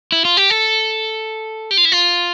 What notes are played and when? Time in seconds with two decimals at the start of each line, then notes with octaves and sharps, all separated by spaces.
0.12 E4
0.25 F4
0.37 G4
0.50 A4
1.71 G4
1.77 F4
1.85 E4
1.92 F4